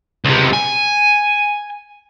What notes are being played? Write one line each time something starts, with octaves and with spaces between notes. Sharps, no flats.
C#2 C3
G#5